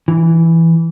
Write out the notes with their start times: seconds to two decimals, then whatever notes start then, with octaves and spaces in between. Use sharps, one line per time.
0.08 E3